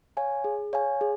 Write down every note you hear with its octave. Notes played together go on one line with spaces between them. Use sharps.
C#5 F5 G#5
G#4
C#5 F5 G#5
G#4